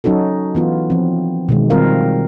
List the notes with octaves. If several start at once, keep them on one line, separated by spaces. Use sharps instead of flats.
F#3 C#4 D#4 F#4 A4
E3 B3 F4
F3 C4
B2 D#3 G#3
D#3 G3 C4 F4 A#4 F5